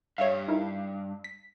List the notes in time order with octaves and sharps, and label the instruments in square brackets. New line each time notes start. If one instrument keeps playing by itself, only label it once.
[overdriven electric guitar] G2 [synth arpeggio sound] C#5 E5 F5
[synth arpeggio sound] D#4 E4 A#4
B6